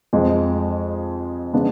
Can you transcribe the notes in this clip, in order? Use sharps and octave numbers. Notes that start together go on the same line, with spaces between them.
F2 F3 G#3
C#3 G#3 B3 D4